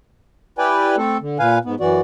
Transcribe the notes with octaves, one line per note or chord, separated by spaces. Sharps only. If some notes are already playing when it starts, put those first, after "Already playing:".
E4 G4 B4 D5 G5 G#5
A3 C4 A4
D3
A#2 B4 F5 G#5
G#2 B3
F#2 E3 F#4 D5